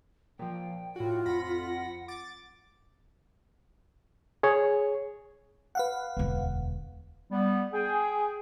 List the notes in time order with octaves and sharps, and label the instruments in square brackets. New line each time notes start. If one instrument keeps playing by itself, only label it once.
[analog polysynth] A#2 F3 [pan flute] G5
[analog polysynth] A2 F#4 [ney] F4
[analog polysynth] F2 B5 A#6 [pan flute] F#5
[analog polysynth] D6 A6
[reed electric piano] G#4 C#5
[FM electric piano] B4 F5 F#5
[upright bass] E1 D2
[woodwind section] G3 B3
G#4 G5